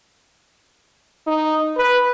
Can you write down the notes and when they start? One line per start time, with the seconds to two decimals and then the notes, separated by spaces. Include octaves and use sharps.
1.27 D#4
1.77 B4